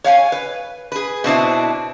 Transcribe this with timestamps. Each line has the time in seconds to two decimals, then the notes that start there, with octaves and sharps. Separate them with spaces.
0.04 C#5 F5 F#5 G#5
0.32 B4
0.92 G#4 B4
1.24 B2 C4 D4 E4